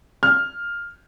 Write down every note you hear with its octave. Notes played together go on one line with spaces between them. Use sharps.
F6